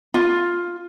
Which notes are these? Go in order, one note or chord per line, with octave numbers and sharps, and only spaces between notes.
F4